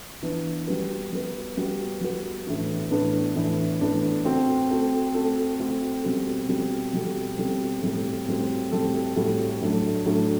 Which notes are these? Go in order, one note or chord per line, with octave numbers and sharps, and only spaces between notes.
E3 B3 D4
G3 B3 F#4 B4
G3 B3 F#4 B4
G3 B3 F#4 B4
G3 B3 F#4 B4
A2 E3 B3 D4
A2 E3 B3 D4
A2 E3 B3 D4
A2 E3 B3 D4
A3 C4 F#4 A4
A3 C4 F#4 A4
A3 C4 F#4 A4
A3 C4 F#4 A4
B2 G3 C4 F#4 A4
B2 G3 C4 F#4 A4
B2 G3 C4 F#4 A4
B2 G3 C4 F#4 A4
A2 G3 C4 F#4 A4
A2 G3 C4 F#4 A4
A2 G3 C4 F#4 A4
A2 G3 C4 F#4 A4
A2 F#3 A3 D4
A2 F#3 A3 D4